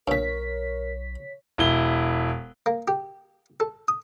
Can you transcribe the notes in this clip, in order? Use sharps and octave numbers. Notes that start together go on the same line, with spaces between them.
B1 G2 A#2 A#4 C#5 B6
E1 E4 G7
A#3
G4
A4
D#6